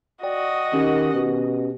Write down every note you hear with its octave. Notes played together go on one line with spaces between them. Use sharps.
F#4 D5 D#5 G5
D#3 C#4 G4
B2